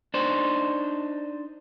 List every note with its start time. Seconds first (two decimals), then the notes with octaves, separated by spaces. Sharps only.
0.14 D4 D#4 C5